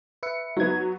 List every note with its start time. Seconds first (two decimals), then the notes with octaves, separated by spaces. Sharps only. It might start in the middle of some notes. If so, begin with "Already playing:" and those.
0.23 B4 E5 C#7
0.57 F#3 B3 D#4 G#6